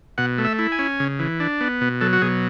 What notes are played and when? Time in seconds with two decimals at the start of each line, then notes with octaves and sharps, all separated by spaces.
0.18 B2 F#5
0.38 A3
0.45 E5
0.59 E4
0.72 G#5
0.79 C#4
1.00 C#3
1.19 E3
1.40 D4
1.61 B3
1.81 B2
2.01 F#3 A4
2.13 F#4
2.22 B2 G#4